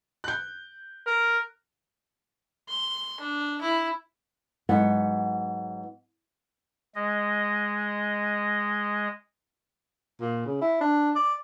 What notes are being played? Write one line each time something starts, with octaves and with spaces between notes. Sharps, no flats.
F#6 G6
A#4
C6
D4
E4
G#2 F#3 B3 F#5
G#3 D#5
A#2
C#3
E4
D4
D5